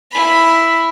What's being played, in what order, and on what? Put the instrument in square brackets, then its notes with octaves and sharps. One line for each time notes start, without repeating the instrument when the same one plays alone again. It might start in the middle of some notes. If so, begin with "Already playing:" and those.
[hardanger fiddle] E4 B5